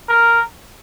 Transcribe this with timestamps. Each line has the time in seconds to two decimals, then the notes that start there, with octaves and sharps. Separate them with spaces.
0.09 A#4